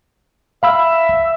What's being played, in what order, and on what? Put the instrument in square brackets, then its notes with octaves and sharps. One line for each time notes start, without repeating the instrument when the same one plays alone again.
[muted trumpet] E5 [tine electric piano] F5 B5 E6